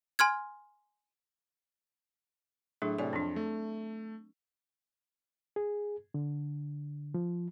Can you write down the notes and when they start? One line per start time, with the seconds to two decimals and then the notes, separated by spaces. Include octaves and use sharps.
0.19 G#5 C6 F6 G#6
2.82 A2 F#3 D4 G#4
2.98 A2 C3 C#5 D5 G#5
3.13 F2 C4 D4
3.36 A3
5.56 G#4
6.14 D3
7.14 F3